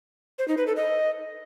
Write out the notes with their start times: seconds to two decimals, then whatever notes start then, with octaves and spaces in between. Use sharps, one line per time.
0.39 C5
0.48 D#4
0.57 B4
0.67 A4
0.76 D#5